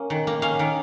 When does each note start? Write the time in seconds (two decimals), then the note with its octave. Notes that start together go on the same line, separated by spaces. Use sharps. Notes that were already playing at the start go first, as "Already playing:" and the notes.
Already playing: A#3 C#4
0.10 D#3
0.27 A#3
0.42 C#4 F5
0.59 D#3